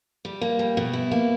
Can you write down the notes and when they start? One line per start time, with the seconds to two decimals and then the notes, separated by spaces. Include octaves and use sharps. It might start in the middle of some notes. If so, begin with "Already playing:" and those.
0.25 G3
0.41 A#3
0.59 G3
0.77 B2
0.93 E4
1.11 A#3